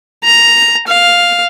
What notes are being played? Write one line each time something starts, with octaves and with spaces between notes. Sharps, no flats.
A#5
F5